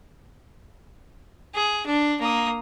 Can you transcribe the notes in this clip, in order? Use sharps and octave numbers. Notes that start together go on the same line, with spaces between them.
G#4
D4
A#3 D#6